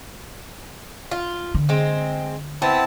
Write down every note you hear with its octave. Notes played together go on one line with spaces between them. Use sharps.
F4
D3
G#3 C4
B3 C4 E4 A5